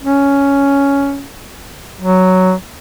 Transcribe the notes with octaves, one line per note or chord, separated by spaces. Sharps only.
C#4
F#3